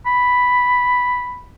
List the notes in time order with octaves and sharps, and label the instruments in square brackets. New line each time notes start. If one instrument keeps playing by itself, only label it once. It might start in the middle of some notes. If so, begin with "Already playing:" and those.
[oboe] B5